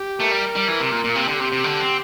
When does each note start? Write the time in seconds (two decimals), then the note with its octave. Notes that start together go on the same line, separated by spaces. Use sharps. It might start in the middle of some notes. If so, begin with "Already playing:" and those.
Already playing: G4
0.20 A3 G4 A#4
0.31 G3
0.56 G3
0.68 E3
0.80 C3
0.91 A#2
1.04 A#2
1.15 C3 A#3 G4
1.28 D3
1.40 C3
1.52 C3
1.64 D3
1.80 C4